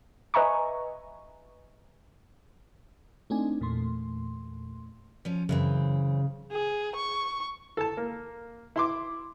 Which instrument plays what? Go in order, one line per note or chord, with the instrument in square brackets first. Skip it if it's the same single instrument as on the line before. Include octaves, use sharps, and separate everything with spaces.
[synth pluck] B4 D#5 E5 G#5 A#5 C#6
[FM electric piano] A3 C4 D4 D#4 G#5
E2 A#2 A3 C6
[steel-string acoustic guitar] F3 C#4
[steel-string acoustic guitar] F#2 E3 C4 [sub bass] C#3
[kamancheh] G#4
C#6
[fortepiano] A4 A5
A#3
E4 C6 D6